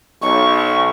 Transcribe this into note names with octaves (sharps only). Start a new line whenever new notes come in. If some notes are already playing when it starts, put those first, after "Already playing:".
B1 C#6